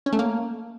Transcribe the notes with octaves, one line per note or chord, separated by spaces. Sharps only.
C#4
A3
A#3